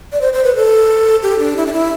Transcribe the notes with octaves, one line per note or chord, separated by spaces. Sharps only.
D5
C5
C5
B4
A4
G4
D4
E4
D4
E4